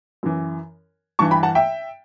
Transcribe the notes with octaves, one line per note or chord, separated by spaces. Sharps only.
F#2 E3
G2 E3 A5 C#6
G5 B5
F#5 A5
E5 G5